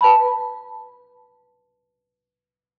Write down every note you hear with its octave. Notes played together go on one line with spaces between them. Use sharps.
B4 A5 B5